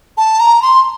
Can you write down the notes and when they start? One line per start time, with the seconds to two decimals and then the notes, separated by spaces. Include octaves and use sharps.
0.17 A5
0.40 A#5
0.62 C6